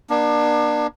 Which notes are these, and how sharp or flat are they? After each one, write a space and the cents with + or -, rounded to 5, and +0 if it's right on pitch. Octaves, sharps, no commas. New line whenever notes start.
A#3 +45 D4 +25